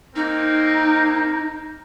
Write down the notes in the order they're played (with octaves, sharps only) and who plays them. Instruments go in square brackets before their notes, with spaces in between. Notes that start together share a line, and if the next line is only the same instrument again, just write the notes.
[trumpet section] A#3 C4 A#4 [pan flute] D#4